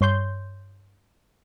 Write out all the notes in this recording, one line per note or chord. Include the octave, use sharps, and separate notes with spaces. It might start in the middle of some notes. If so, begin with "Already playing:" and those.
G2 C#5 C6 G6